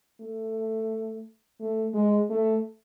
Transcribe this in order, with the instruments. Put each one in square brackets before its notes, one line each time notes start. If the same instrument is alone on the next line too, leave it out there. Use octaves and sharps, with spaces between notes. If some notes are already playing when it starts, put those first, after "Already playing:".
[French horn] A3
A3
G#3
A3